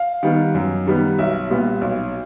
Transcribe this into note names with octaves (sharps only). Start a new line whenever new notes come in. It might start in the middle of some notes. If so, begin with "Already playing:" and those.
Already playing: F5
D#3 G3 B3
F#2
D#3 G3 B3
B1 E5
A#2 G3 B3
B1